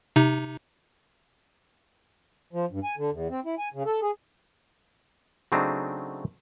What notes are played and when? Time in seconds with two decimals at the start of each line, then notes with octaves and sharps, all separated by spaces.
0.16 C3 D#4
2.53 F3
2.71 G2
2.84 G#5
2.98 D3
3.11 E2
3.30 C4
3.45 E4
3.58 G#5
3.74 C#3
3.86 A4
4.02 G#4
5.52 C#3 F#3 A3 C4 D4 D#4